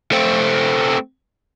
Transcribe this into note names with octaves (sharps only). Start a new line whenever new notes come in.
A3 C4